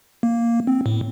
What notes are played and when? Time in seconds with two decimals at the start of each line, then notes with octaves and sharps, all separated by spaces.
0.23 A#3
0.67 C4
0.86 A2